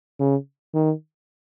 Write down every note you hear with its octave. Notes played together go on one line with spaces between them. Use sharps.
C#3
D#3